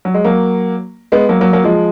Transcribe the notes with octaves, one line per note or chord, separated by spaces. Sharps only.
F#3
G#3
F#3 A#3
G#3 B3
F#3 A#3
F#3 A#3
F#3 A#3
F3 G#3